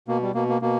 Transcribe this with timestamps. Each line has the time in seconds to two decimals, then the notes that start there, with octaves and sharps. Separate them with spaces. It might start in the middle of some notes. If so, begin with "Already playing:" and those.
0.08 B2 A#3
0.22 G3
0.34 B2 A#3
0.49 A#3
0.62 B2 A#3